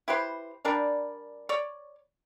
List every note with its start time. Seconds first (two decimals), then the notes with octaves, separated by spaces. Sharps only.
0.08 E4 G4 B4 C5
0.65 G3 D4 A#4 D5
1.49 C#5 D5